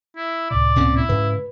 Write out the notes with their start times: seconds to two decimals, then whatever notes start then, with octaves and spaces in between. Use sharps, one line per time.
0.17 E4
0.51 C#2 A2 C3 D5
0.76 A#2 C4 C#4
0.96 E4
1.09 G#2 C#3 B4